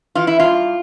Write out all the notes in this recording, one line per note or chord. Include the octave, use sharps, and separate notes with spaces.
E3 F4
E4
G2 F4